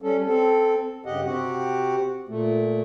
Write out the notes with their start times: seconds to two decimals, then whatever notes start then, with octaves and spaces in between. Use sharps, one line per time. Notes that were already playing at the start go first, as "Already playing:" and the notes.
0.02 G3 C#4 A4
0.26 C4 A4
1.06 G2 C#3 G4 D#5 F#5
1.26 C3 C4 F#4 G4 F#5
2.29 A#2 A3